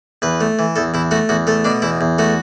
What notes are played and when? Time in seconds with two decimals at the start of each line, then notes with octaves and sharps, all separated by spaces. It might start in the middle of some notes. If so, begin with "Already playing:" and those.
0.22 E2 B4
0.41 A3
0.59 E3
0.76 E2 A4
0.94 E2 E4
1.11 A3 F#4
1.29 E2 F#4
1.47 A3 A4
1.65 B2 D4
1.82 E2 E4
2.01 E2
2.18 A3 F#4